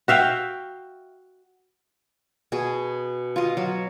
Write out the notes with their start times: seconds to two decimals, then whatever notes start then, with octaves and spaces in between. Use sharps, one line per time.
0.08 F#4 E5 F5 G5
2.52 B2 G#4
3.36 F4 D#5
3.57 F#3